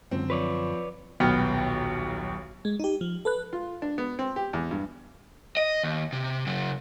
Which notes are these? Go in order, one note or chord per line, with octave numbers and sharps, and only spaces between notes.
C#2 F#2 D3 C4
F3 B4 C#5 D5
D#1 B1 B3 G5 F6
G#3
D#4 G4
F3
A4 B4 F#6
F4
D4
B3
C4
G4
E2
G2
D#5
D#2
C3
C#3 F#3